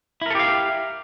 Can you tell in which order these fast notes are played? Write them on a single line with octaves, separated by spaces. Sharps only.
E4 A#4 A4 G4 F5